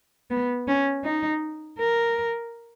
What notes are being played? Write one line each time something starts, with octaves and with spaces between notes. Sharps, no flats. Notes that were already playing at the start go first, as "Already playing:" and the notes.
B3
C#4
D#4
A#4